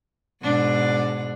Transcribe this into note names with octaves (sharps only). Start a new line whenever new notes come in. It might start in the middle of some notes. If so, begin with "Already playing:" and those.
G#2 B2 D4